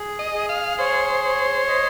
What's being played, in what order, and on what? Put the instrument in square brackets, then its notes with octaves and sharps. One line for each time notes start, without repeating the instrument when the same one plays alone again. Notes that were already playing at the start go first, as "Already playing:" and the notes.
Already playing: [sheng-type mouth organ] G#4
[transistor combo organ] D#5
[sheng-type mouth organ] G#4
[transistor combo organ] F5
[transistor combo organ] C5 [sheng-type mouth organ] C#5
[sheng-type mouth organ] C#5
D#5